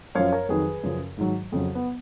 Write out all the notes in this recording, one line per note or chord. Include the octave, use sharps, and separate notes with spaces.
F#2 F3 C#5 F5
A#4 C#5
F2 D#3 F#3 G#4 B4
F#2 C#3 F3
G#2 D#3 F#3
F2 C#3 F#3
B3